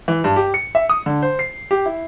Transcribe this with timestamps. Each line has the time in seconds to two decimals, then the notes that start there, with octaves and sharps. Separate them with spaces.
0.08 E3
0.24 G2
0.36 G4
0.54 C#7
0.75 E5
0.89 D#6
1.06 D3
1.22 C5
1.39 C7
1.71 G4
1.86 E4